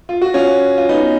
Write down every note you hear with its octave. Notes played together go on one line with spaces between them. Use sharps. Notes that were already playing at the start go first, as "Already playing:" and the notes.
F4
F#4
C#4 F4
F4
B3 D#4